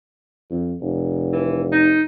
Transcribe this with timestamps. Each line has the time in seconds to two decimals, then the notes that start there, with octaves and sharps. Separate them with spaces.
0.50 F2
0.81 F1
1.32 E3
1.72 D#4